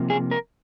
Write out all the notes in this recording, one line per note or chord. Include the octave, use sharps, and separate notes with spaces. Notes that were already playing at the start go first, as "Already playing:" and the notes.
Already playing: C3 F3 A#3
G#4
A#4